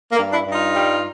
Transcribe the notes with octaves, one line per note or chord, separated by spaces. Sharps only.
A#3
G2
D4 E4
G2
D#4 F4
G3